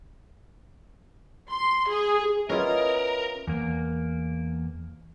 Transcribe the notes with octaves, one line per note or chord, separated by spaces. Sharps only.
C6
G#4
B3 C#4 E4 F4 A#4 D#5
E2 A#3